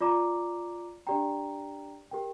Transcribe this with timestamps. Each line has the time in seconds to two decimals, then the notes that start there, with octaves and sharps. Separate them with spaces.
0.01 F4 D5 A#5 D6
1.07 D4 G4 D5 G5 A#5
2.11 G4 A#4 G5